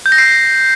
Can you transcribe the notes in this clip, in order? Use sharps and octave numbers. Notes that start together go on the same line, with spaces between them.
G6
A#6
C7